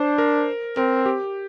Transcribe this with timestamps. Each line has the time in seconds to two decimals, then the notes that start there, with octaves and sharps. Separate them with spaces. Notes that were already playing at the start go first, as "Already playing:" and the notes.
Already playing: D4 C5
0.18 A#4
0.77 C4 A#4
1.06 G4